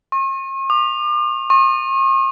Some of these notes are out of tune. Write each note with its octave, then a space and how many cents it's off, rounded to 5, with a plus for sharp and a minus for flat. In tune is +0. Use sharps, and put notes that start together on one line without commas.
C#6 -45
D6 +40
C#6 -45